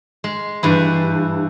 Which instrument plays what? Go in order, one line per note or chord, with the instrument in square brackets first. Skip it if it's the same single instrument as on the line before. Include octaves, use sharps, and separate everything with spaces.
[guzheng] G#3
G2 E3 E4